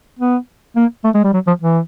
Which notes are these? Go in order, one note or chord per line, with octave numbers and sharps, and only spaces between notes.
B3
A#3
A3
G#3
G3
F#3
F3
E3